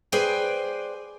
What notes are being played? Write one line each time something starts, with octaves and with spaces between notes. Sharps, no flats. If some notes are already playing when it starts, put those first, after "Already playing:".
G#4 B4 C5 D5 G5 G#5